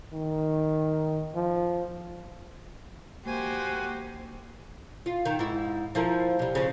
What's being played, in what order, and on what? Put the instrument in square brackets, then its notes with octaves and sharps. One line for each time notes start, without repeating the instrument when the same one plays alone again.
[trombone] D#3
F3
[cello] A#3 C5 [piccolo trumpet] F#4 [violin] G4 [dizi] G#5
[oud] F4
D#3
G#2 E4
F3 E4 A#4
C3 G3
C#3 F3